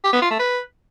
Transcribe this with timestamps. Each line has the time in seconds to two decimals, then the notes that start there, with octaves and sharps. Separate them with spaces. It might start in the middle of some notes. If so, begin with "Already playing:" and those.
0.04 G4
0.13 B3
0.22 F4
0.31 A3
0.39 B4